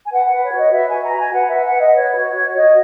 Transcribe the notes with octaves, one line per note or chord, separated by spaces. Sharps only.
G#5
B4 F#5
B4
C#5
F#4
D#5
B4 E5
F#4 G#5
A#5
F#4 G#5
B4 F#5
E5
B4
F#5
B4
D#5
B4 C#5
F#4
F#4
F#4 D#5